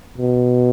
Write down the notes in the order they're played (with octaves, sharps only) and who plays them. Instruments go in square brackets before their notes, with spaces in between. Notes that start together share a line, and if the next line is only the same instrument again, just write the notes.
[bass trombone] B2